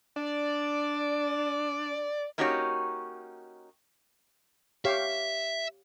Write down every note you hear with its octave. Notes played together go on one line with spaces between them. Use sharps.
D4 D5
A#3 C#4 D#4 F#4 G4 C#5
G4 C#5 E5 F5